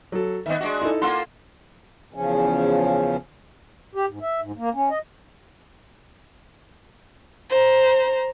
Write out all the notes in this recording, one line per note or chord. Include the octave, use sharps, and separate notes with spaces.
F#3 A4
D#3 B3 D#5 E5
G#3 D4 F#4
D#4 E4 A4
A#3 F4 A4 F#5 C6
E2 C#3 F3 C#4
G4
G#2
E5
G#2
A#3
C#4
D#5
C5 A#5